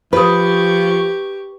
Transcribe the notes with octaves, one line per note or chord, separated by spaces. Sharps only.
F3 G4 B4 C5 C#6 D#6